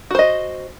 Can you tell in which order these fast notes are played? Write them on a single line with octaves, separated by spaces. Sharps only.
F#4 C5 D#5